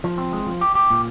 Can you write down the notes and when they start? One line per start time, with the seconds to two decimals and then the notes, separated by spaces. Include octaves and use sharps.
0.04 F3
0.18 C4
0.33 G#3
0.46 F3
0.61 G4
0.75 G4
0.90 A#2